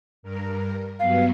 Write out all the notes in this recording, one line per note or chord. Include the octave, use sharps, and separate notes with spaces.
G2 A#4
G2 F#3 B3 F5